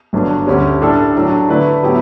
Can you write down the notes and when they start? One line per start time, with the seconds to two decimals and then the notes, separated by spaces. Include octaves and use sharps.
0.13 G1 G2 F#3 A3 D4
0.47 D2 D3 G3 C#4 G4
0.81 A2 G3 D4 A4
1.15 A2 F#3 A3 D4
1.48 D3 A3 E4 B4 D5
1.83 A2 F#3 B3 E4 G4